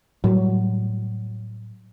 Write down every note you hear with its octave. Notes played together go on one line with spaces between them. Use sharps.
A2 F#3 G3